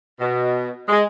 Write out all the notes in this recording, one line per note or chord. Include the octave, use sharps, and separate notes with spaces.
B2
G#3